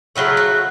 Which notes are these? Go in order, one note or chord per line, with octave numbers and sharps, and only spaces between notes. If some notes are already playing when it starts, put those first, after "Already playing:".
C#3 F#3 A3 E4
F#4